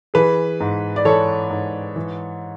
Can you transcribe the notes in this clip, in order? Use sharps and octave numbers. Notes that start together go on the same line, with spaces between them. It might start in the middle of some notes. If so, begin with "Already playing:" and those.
E3 G#4 B4
G#2
D5
E3 A4 C#5
G#2
E3